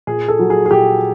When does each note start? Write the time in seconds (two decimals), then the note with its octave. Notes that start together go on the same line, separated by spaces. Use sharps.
0.07 A#2 G#4
0.28 A4
0.39 F#3
0.50 G#4
0.66 G#4
0.71 A#2 G4